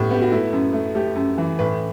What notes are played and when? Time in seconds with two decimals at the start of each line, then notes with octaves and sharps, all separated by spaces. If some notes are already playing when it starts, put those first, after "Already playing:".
Already playing: A2 G3 B3
0.11 B3 G4
0.22 F#4
0.32 A3 E4
0.53 F#2
0.73 A3
0.95 A3 G4
1.15 F#2
1.38 E3
1.59 A2 B4